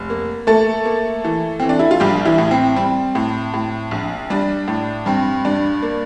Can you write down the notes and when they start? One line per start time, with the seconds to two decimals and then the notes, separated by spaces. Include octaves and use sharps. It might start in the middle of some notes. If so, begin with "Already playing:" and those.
Already playing: F1
0.10 A#3
0.47 A3 A#3 A4
0.85 A#3
1.25 E3
1.60 E3 C4
1.69 D4
1.79 E4
1.91 F4
2.00 A#1 G3 G4
2.25 E3 E4
2.38 A2
2.51 C4
2.76 G3 C4
3.15 A2
3.54 A2
3.91 A#1
4.30 G3 D4
4.68 A2
5.06 G2 C4
5.45 G2 D4
5.82 A#3